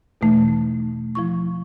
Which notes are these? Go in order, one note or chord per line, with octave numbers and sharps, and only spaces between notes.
E2 B2 E3 A3 D#4
F3 E4 C#6